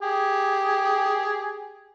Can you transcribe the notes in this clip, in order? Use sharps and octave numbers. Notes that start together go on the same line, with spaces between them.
G4 G#4